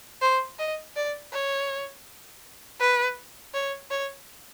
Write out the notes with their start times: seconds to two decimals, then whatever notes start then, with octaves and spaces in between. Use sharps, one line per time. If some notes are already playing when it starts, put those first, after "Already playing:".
0.22 C5
0.59 D#5
0.96 D5
1.33 C#5
2.80 B4
3.54 C#5
3.91 C#5